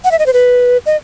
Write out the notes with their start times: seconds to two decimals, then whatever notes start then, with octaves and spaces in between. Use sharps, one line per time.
0.04 F#5
0.11 E5
0.19 D#5
0.26 C5
0.33 B4
0.86 D#5